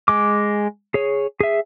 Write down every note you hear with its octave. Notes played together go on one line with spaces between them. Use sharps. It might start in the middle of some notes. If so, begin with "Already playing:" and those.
G#3 D6
G#4 C#5
G#4 E5